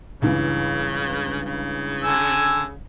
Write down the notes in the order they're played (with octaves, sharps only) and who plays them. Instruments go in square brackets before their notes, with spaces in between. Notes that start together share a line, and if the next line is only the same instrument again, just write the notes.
[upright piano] C#2 G2 E3 [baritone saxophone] C#3
[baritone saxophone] C#3
[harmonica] D3 G#5 E6